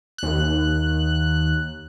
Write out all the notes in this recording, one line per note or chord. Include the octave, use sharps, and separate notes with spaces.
D#2 F#6